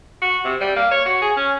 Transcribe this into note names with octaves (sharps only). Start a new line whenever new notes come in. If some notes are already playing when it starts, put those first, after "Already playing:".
F#4
C3
G3
A#3
C#5
F#4
G#4
C#4